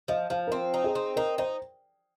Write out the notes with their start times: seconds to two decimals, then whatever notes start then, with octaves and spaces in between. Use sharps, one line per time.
0.08 F3 D#5
0.30 F3 F5
0.47 A#4
0.51 C4 C5
0.74 D#4
0.84 G#4
0.95 C4
1.16 D#4 A#4
1.38 D#4 C5